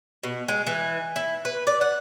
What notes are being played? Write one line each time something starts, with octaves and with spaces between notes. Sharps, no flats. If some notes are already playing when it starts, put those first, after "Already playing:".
B2
G#3
E3
E4
B4
D5
F#5